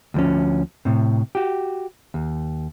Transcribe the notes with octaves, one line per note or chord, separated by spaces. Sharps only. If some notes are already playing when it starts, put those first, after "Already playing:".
D2 F3 C#4
A2 C3
F#4 G4
D#2